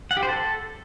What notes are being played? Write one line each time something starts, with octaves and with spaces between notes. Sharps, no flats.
F#5
G4
C5
A4